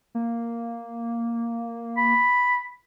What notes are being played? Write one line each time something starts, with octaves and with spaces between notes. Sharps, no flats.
A#3
B5